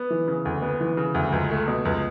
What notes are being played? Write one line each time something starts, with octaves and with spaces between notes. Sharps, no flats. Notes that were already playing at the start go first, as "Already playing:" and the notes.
Already playing: B3
E3
C#3
D2
B3
E3
C#3
D2
C#2
A3
B2
C#2